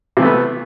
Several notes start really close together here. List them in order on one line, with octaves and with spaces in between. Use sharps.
C3 E3 A3 B3